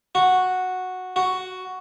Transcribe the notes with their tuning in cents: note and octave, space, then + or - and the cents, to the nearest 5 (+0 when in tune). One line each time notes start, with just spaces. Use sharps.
F#4 -5
F#4 +5